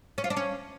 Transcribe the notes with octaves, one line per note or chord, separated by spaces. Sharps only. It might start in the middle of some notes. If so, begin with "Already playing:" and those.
C#4
F4
D4
C#4